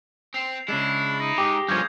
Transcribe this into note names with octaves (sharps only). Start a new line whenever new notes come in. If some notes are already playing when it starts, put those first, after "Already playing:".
C4 C7 F7
C#3 G#3 D4 E4
D#4 A#6
G#2 G4 D6 D#6
G2 F3 G#3 A#3 C#4 G6 G#6